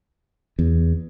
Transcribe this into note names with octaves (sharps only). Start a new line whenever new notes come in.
E2